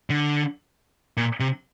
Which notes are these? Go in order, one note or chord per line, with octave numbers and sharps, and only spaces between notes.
D3
A#2
C3